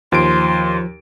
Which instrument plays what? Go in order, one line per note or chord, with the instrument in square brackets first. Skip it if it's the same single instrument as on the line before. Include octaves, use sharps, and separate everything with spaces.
[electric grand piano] D#2 D7 [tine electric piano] F3 [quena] C6